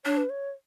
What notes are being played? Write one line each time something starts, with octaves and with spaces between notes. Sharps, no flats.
D4 C#5
B4
C#5